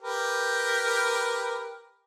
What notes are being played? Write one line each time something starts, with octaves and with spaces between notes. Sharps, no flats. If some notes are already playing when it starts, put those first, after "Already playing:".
G4 A#4 B4